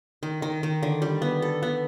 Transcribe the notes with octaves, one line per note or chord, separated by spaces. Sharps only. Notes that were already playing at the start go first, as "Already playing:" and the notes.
D#3
D#3
D#3
D3
G3
B3
A4
B3